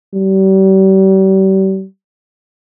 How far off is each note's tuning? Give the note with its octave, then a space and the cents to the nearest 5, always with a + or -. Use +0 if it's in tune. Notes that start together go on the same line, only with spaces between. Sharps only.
G3 -40